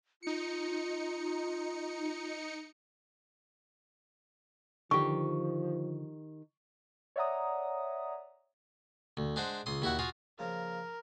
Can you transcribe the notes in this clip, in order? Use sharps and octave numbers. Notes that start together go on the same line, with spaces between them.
D#4 F4 C#7
D3 D#3 F3 G4 C#6
C#5 D5 E5 F#5 A#5 D#6
D2
G#3 D4 C5 F#5
C#2 C6 D#6
D#2 E4 F#4 F#5
F4 F#4 G#4
C#3 F3 A#3 A#4